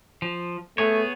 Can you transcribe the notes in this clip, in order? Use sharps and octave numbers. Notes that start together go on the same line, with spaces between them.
F3
A3 B3 G#4 C#5